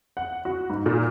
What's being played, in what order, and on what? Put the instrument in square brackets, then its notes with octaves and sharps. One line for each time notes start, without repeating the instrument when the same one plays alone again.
[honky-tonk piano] F#5
F#4
G#2
A#2